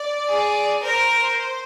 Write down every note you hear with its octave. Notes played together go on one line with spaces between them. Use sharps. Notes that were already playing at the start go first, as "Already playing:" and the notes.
Already playing: D5
G#4
A#4 C5